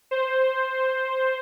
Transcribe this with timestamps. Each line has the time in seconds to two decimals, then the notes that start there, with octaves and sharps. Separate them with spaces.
0.11 C5